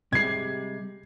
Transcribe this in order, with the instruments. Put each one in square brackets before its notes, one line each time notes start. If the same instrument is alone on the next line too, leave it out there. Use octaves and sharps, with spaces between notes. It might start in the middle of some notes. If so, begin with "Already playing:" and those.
[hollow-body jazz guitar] C3 G3 G#3 [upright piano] G#6 C7